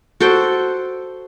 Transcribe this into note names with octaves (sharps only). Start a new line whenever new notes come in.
F#4 A4 C5 G5